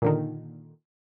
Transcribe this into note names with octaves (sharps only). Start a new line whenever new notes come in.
A#2 D3 D#3